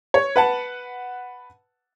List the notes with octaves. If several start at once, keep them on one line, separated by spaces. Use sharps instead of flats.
C#5
B4 F#5 A5